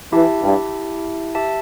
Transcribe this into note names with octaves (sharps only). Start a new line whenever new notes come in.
E3 E4 G4 E5 A5
G2
G4 E5 A5